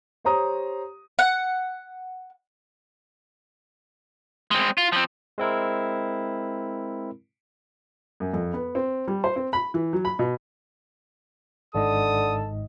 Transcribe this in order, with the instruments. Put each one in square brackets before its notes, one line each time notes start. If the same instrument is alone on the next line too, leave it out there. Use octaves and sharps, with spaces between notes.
[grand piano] G4 C5 C#5 A#5 D#6
[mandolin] F#5
[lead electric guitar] G#3 C4
F4
F3 C4
[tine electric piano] G#3 C4 E4 A#4
[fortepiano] F#2
F2
B3
C4
G3
C5
C4
B5
E3
F#3
B5
B2
[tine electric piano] G#1 G#2 D#5 [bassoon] D3 [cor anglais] A4 [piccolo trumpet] D#6